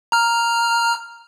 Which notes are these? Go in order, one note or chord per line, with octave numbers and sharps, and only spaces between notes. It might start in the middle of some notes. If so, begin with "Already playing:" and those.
A#5 F6